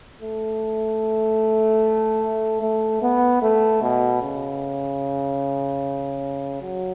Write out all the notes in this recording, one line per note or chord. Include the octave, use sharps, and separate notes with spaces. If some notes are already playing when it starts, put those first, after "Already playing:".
A3
A3
B3
A3
B2
C#3
F#3